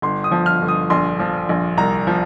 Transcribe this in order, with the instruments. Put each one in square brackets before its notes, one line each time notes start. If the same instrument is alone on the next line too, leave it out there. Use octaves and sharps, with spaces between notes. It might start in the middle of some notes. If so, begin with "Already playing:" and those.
[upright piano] G1 C6
D#6
F3
F6
G1
D#6
A#1 C6
F3
A#1
C2 A#5
F3